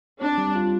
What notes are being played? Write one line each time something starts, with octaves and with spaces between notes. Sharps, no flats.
C4 D4
G3
F4